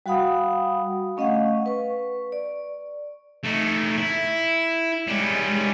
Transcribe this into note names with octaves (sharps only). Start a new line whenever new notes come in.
G3 F#4 F5 F#5 B5 D#6
A3 C#4 D#5 F5 F#5 C#6
B4 C#6
D5
A3 D#4
E4
G3 G#3 C#4